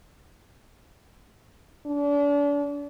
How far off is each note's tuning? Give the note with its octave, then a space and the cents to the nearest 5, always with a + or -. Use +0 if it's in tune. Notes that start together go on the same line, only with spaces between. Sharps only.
D4 -35